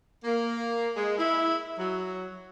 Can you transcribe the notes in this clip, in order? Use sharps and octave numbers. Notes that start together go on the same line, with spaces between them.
A#3
G#3
E4
F#3